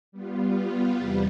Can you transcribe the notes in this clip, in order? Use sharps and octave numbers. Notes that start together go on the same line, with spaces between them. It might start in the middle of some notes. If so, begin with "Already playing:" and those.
G3 B3 F4
E2 C3 G3